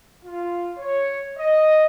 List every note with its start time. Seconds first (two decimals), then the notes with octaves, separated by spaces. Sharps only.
0.25 F4
0.79 C#5
1.38 D#5